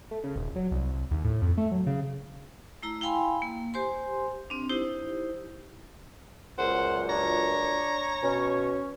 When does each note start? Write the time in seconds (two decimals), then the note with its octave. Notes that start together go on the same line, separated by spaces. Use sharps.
0.11 A3
0.24 C#3
0.36 D#1
0.55 F#3
0.71 C2
0.93 C2
1.11 D#2
1.24 A2
1.42 F2
1.57 A3
1.71 F#3
1.86 C#3
2.83 A3 E4 A#5
3.01 E4 F5 G5 G#5 B5 C6
3.42 A#3
3.74 G4 C5 G#5 C6
4.50 C4 D4
4.69 D#4 E4 G4 C5
6.59 C#2 F#2 A#2 C5 F#5
7.09 D4 C#5 A#5
8.23 B2 C#4